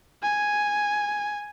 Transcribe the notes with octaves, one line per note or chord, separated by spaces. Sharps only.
G#5